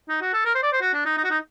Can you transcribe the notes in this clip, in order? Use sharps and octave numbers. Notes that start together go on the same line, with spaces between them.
D#4
F#4
A4
A#4
C5
D5
C5
F#4
D4
D#4
D#4
F#4
D#4